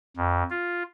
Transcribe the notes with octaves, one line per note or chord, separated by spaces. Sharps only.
F2
F4